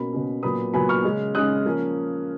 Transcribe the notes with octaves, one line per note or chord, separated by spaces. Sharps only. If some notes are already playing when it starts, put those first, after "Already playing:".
Already playing: B2 A#3 C#4 B5
B2 A#3 C#4
A#2 F#3 B3 B5 D#6
A#2 F#3 B3 G#5 B5
C#6 F6
C#3 G#3 C#4
C#3 G#3 C#4 D#6 F#6
F3 A#3 C#4